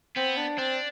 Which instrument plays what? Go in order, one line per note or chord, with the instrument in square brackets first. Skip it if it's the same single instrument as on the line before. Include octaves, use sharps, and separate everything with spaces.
[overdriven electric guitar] B3 [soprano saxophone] C4
[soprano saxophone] D4
[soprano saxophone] C4 [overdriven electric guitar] D4